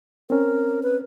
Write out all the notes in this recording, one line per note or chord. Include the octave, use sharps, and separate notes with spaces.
C4 C#4 A#4
B4